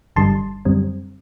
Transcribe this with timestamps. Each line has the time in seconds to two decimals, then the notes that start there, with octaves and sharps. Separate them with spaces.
0.16 G1 G2 D3 G3 A5 C6
0.65 F#2 D3 G3 C4